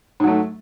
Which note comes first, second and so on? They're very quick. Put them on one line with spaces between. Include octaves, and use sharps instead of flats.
G#2 F#3 A3